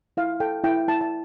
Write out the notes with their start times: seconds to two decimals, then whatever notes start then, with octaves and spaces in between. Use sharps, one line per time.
0.17 E4 F5
0.40 A4 G5
0.64 E4 G5
0.88 E4 A5
1.01 A5